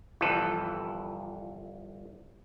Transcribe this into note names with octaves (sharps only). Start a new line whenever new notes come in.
G1 C2 E3 F3 A4 B4